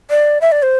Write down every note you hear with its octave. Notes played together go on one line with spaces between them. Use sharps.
D5
E5
D5
C5